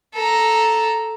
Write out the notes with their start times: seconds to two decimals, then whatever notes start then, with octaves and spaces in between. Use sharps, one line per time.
0.15 A4 A#5